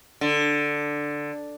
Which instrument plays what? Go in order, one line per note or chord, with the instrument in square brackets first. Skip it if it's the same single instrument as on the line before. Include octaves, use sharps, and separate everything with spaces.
[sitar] D3